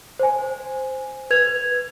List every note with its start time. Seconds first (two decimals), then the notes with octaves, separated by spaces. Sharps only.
0.19 C5 G#5
1.30 B4 G#6 F7